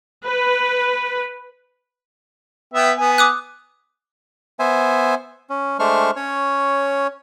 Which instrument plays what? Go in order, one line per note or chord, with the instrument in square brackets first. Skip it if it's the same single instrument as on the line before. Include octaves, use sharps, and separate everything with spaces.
[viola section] B4
[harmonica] B3 E5 G5
B3 G#5
[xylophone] D6 D#6 F#6
[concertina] B3 C5 E5 G#5
C#4
G#3 A3 D4 C5 C#6 F6
C#4 C#5